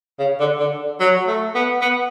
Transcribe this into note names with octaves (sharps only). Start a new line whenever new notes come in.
C#3
D3
D3
F#3
A3
B3
B3